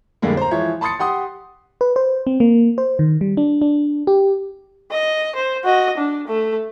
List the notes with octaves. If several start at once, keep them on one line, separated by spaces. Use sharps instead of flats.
F2 A2 D3 G3 G#3 A#3
C5 A#5
E3 F3 G#3 E4 C#5
A5 B5 C6 D#6 A6 C#7
G4 F#5 C6 D#6
B4
C5
C4
A#3
C5
D#3
G3
D4
D4
G4
D#5
C5
F#4 D#5
D4
A3